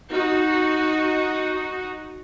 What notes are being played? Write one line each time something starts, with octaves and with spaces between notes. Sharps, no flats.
D#4 F#4